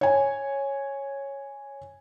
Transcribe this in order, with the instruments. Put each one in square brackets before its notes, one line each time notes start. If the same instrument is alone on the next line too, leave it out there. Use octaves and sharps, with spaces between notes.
[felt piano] C#5 G#5